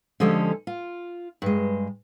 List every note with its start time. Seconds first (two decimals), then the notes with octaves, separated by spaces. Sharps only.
0.20 D3 F3 G#3 C#4 G4 A4
0.67 F4
1.42 G2 G#3